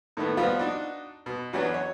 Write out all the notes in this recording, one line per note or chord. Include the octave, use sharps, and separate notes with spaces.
A2 D#3 A3 B3
F3 G3 B3 F4
D4 D#4 F#4
B2
E2 F#3 B3 C#4 D4
C#5